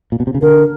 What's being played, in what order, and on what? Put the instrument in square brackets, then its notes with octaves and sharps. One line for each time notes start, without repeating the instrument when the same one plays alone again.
[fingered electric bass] A#2
B2
C3
C#3
[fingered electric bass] D3 [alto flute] A#4